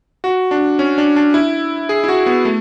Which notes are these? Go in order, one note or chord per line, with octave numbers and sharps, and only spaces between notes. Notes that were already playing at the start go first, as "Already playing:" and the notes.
F#4
D4
C#4
D4
D4
E4
G#4
E4
F#4
B3
A3